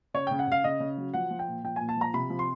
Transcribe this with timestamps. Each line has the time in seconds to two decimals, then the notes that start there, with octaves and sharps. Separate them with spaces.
0.14 C#3 C#5
0.27 C#3 G5
0.39 F#5
0.47 C#3 F5
0.64 C#3 D#5
0.80 C#3
0.98 F#3
1.14 F3 F#5
1.31 F3
1.39 G5
1.48 A#2
1.64 F3 G5
1.76 A#2 G#5
1.89 A5
1.97 F3 A#5
2.14 C3 B5
2.30 F3
2.39 C6